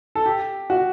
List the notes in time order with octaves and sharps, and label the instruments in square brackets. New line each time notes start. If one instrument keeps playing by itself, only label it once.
[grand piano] A4
G4
F#4